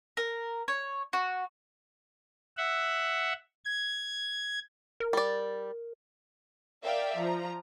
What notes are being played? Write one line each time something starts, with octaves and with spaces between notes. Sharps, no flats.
A#4
C#5
F#4
E5 F#5
G#6
A#4
G3 D5
A#4 D5 E5 F5 G5
F3 A#5